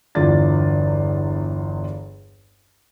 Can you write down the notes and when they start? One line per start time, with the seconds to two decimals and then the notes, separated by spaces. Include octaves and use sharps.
0.15 G1 E2 D3 F4 D5 A6